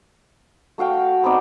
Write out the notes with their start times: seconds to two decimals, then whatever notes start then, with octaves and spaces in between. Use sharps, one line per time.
0.78 A3 F#4 F5 G5
1.23 B3 C4 D#4 D5